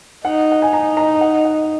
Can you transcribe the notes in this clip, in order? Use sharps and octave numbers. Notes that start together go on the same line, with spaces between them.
D#4 F#5
F#5
G#5
D#4 A#5
A#5
F#5
F#5